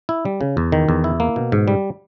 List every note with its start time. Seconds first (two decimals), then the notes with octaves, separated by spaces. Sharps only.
0.09 E4
0.25 G3
0.41 C#3
0.57 E2
0.72 D#3
0.89 E2
1.04 E4
1.20 A#3
1.36 B2
1.52 G#2
1.68 G3